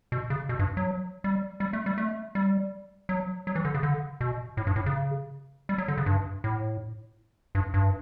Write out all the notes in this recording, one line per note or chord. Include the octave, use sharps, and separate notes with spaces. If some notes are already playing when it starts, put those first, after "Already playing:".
B2
C#3
B2
G2
F#3
G3
G3
A3
G3
A3
G3
F#3
F#3
E3
D3
C#3
D3
B2
A2
G2
A2
C#3
G3
F#3
D3
C#3
G2
A2
G2
G2